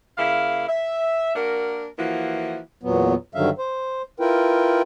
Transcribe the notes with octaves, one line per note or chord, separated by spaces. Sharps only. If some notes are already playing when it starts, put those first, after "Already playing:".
C#3 A#3 E4 F5
E5
A#3 D4 F#4 A#4
E3 F3 A#3 E4 F#4
E2 A#2 F#3 B3
G2 D3 D#3 F#3 E5 F5
C5
E4 F4 A#4 B4 G5